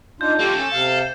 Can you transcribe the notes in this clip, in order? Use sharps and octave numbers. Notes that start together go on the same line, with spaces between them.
D4 D#4 F4 G6
A3 A#3 F4 G4 A4
C#4 A4
C3 F5